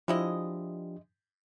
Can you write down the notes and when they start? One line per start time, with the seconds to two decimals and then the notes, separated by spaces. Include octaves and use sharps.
0.08 F3 G#3 D4 E4 G4 D#5